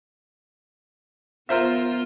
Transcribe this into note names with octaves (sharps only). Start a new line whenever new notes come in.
B3 F4 A#4 C5 E5